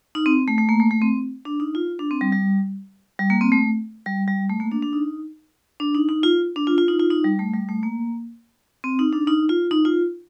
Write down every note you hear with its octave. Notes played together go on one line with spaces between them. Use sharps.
D#4
C4
A3
A3
A#3
A3
A3
C4
D4
D#4
F4
D4
C4
G3
G3
G3
A#3
C4
A3
G3
G3
A3
A#3
D4
D4
D#4
D4
D#4
D#4
F4
D4
F4
F4
D#4
F4
D#4
G3
A3
G3
A3
A#3
C4
D#4
D4
D#4
F4
D#4
F4